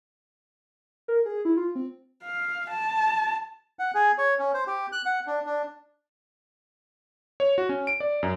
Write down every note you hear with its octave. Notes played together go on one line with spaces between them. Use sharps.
A#4
G#4
E4
F4
C4
F5
A5
F#5
G#4
C#5
C#4
C5
G4
F#6
F#5
D4
D4
C#5
F#4
C#4
D7
D5
F#2